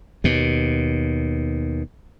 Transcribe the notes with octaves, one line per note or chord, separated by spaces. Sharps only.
D#2 B2